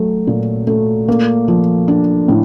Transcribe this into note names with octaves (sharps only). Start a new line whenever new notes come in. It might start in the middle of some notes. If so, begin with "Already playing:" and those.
Already playing: F#3 A3
A#2
A3
A#3
F3
D4
A2